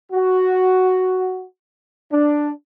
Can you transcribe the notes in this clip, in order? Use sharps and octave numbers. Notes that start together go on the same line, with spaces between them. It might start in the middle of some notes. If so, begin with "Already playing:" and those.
F#4
D4